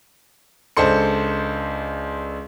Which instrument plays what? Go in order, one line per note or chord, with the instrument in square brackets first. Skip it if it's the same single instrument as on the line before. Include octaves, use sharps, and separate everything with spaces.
[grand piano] C#2 D4 A4 C5 C6 C#7